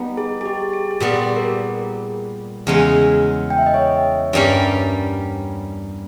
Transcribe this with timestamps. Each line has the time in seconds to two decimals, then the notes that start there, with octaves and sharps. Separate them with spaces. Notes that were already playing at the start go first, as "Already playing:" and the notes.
Already playing: G3 B3 D#4
0.17 G#4
0.41 G#4
0.46 G4
0.73 G#4
0.91 G#4
1.00 A#2 G3 B3 G4
1.36 A#4
1.42 G#4
2.67 E2 C#3 G#3 C#4
3.50 G5
3.58 E5
3.66 D#5
3.74 C#5 E5
4.33 G2 G3 A#3 C#4 G4